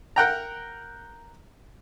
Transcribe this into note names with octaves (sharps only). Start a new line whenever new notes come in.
A#4 F#5 G5 A#5